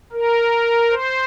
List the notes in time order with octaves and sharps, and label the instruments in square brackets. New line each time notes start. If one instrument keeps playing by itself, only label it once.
[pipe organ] A#4
C5